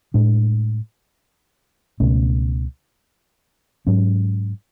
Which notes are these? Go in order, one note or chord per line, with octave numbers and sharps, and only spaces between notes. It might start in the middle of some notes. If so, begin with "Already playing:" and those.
A2 G#3 D4
C#2 B2 A3 C#4
G#2 F#3 C#4